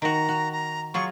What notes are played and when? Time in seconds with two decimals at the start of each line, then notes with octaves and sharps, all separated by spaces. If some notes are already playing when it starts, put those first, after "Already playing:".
0.02 D#3 F#4 A#5
0.29 F#4
0.53 A#5
0.94 F#3 F4 G#4 C#6